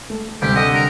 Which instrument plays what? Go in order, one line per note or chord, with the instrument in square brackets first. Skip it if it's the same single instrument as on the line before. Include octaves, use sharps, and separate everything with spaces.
[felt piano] A3
[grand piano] D2 [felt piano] C3 G3 B6 [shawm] G4
[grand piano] D3 [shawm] D#5
[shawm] A#4